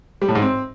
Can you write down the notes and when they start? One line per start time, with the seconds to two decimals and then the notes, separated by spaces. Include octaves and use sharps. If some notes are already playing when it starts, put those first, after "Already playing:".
0.22 G3
0.28 A2
0.35 G#2
0.42 C4